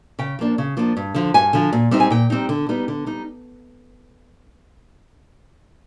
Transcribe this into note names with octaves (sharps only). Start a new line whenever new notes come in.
C#3 G5
F3 A#3 D4
C#3
F3 A#3 D4
G2
D3 F3
G2 G#5
D3 F3
A#2
G3 C4 D#4
G#5
A#2 G5
G3 C4 D#4
D3
G3 B3 D#4
D3
G3 D#4